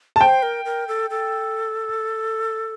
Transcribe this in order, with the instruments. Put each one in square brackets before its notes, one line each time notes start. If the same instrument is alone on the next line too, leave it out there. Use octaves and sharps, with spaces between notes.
[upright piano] A5
[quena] C5 [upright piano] G5
[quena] A#4
A#4
A4
A4